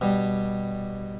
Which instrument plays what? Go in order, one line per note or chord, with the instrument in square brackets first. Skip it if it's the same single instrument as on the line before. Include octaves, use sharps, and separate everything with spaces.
[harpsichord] B2 G3